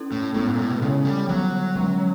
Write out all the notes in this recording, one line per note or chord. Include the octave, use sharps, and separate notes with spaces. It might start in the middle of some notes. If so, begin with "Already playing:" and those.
Already playing: C#4 E4 A4
A2
A2 G#3 B3 E4 A4
G#2
A#2
A2
B2
C#3 C#4 E4 A4 C#5
G3
D3 F#3 G3 B3
D3 F3 G#3 C#4